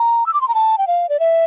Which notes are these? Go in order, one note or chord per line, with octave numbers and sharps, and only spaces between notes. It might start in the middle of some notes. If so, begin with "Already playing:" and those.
Already playing: A#5
E6
D6
C6
A#5
A5
G5
F5
D5
E5